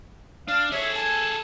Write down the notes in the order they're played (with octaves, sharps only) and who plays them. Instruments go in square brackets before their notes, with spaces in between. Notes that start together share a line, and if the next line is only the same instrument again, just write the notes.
[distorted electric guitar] D4 [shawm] F5
[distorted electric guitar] G#4 A4 [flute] C#5 [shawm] E5
[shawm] G#5 [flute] A5